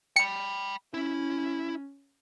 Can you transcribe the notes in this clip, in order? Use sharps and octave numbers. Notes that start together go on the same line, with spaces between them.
G5 B5 C#7
C#4 E4